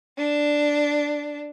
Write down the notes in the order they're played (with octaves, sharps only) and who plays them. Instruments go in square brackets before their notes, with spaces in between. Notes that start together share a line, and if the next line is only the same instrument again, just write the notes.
[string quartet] D4